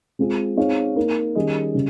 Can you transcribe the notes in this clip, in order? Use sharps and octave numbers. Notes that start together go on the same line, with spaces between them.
G#3 C4 F4 G#4
C4 D#4 G#4 C#5 F5
A#3 D#4 A#4
D#3 G3 C#4 G#4 D#5
C#3 G3